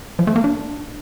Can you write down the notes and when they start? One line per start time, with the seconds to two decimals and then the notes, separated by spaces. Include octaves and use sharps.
0.19 F3
0.27 A3
0.36 A#3
0.44 D4